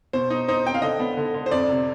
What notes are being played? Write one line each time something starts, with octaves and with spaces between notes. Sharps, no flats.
B2 C5
D#4
D#4 C5
C4 G5
F5
D3 D#5
B3
D3
D3
C5
F2 D5
C3